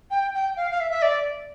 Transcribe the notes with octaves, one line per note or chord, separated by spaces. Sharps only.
G5
G5
F5
F5
E5
E5
D5